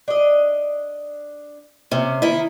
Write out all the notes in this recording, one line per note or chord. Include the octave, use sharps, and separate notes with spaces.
D4 D#5
C3 C#4
D#3 E4 D#5